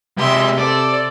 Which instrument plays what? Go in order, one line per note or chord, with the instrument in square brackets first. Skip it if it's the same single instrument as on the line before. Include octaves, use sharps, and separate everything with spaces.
[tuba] C3 [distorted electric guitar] G#3 G4 [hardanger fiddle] E5 C6
[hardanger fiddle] A4 C5 [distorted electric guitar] D5